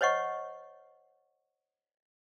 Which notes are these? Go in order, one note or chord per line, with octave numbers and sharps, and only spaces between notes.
C5 C#5 D#5 F#5 C#6